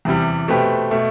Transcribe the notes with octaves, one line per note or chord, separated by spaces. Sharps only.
E2 C3 E3 G3
B2 A3 C4 G4 B4
B2 A3